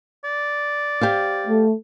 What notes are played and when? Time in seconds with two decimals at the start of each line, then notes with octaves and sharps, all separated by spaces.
0.24 D5
1.01 G4 C5 F5
1.47 A3